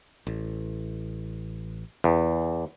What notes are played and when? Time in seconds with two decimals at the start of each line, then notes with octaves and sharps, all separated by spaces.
0.27 A1
2.04 E2